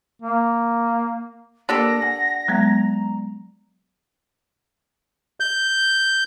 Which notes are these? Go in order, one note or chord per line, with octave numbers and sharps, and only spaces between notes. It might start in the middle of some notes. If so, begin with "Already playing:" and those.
A#3
A#3 D4 G4 A4 A#6
F#5 G#5
F#3 G#3 B3 A#5
G6